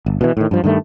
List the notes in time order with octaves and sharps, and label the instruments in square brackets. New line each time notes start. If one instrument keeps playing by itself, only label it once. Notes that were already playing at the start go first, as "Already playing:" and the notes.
[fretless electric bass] G1
B2 D3 E3
A2 D#3
G2 F3
G2 D#3 A3